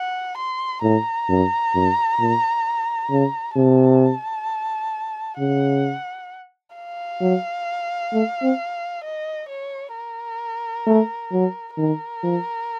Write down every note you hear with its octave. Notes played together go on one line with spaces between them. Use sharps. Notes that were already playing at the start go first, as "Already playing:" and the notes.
Already playing: F#5
C6
A2 A#5
F#2
F#2
A#2
C#3
C3 A5
C#3 F#5
F5
F#3
A3
C4
D#5
C#5
A#4
A3
F#3
D#3 A#4
F3